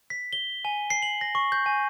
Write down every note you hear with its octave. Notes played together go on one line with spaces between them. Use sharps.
B6
G7
G#5
C7
F#7
A#6
C#6
G6
G#5